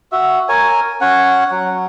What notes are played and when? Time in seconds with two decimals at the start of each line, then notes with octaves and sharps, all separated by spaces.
0.12 F#4 E5
0.49 A#4 C#5 G#5
1.01 C#4 C#5 F#5
1.51 F#3